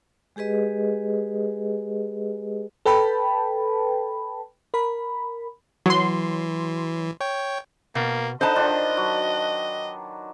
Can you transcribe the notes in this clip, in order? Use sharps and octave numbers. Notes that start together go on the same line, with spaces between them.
G#3 G4 G#4 B4 D#5
A4 B4 G5 A5 B5
A#4 B5
E3 F#3 C6
C#5 G5
B2 A#3
D3 D#4 B4 C5 D#5 A5
D#3 D4 F4
F#3